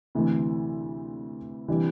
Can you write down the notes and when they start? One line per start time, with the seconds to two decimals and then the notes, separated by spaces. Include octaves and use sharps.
0.15 D2 C3 E3 A3
1.68 C3 E3 G3 D4